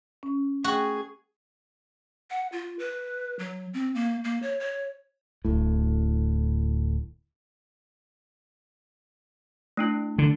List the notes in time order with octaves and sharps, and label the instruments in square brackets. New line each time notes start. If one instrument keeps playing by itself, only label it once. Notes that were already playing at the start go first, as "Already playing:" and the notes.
[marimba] C#4
[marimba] A3 G5 [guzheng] F#4 [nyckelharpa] G#4
[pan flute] F#5
F4
B4
F#3
C4
A#3
A#3
C#5
C#5
[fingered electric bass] D1 A2
[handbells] A3 D4 E4
[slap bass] D3